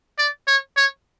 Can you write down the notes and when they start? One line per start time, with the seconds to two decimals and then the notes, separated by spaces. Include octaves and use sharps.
0.18 D5
0.47 C#5
0.77 C#5